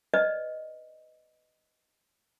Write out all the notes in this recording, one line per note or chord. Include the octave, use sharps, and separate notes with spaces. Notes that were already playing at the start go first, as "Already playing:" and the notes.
B4 D5 D#5